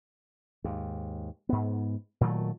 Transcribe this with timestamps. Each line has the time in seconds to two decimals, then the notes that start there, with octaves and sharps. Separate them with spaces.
0.64 D#2 G#2
1.49 G#2 B3
2.21 A#2 D#3 F#3 A3